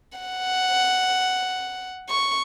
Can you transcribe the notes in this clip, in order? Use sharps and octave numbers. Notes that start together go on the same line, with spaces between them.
F#5
C#6